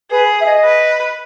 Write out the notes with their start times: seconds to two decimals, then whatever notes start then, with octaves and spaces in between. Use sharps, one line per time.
0.11 G#4 B4
0.41 E5
0.46 D#5
0.64 B4